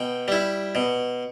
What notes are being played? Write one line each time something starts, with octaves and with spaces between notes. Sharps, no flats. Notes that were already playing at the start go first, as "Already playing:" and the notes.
Already playing: B2 G5
G3 E4
B2